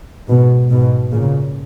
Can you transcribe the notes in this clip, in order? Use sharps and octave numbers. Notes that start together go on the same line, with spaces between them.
G#2 B2
G#2 B2
A#2 C#3